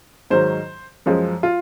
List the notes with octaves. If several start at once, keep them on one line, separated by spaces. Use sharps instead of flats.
G#2 D#3 F#3 C5
F#2 F3 G#3
F4